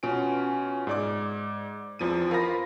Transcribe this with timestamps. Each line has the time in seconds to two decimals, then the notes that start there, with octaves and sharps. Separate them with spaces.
0.03 B2 C#4 F4 G#5 D7
0.87 G#2 D5 D6
1.99 E2 F3 C4 D#7
2.31 F4 A#4 C5 F5 B5 A#6